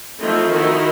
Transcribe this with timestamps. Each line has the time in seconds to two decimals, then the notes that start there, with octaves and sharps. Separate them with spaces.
0.19 F3 A3 C4 D#4 E4
0.50 D#3 D#4 E4 F#4 A#4 D#5